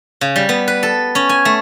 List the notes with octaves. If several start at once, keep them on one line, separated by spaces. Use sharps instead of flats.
C#3
G3
B3
B4
A4
C#4
G#5
A3